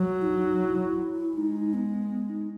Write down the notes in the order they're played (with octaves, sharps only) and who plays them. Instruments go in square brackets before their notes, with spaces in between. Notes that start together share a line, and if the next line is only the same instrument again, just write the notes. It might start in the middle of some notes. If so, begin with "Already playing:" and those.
Already playing: [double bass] F#3
[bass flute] E4
D#4
E4
[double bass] G#3 [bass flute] D#4
[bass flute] B3
B3
D#4